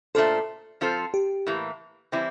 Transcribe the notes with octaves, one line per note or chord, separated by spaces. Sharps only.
A#2 A3 D4 F4 A4 C5
F3 C4 F4 A4 C5
G4
A2 E3 A#3
E3 G3 C4 E4